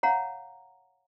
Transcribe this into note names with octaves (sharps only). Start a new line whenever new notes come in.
C#5 F5 F#5 A#5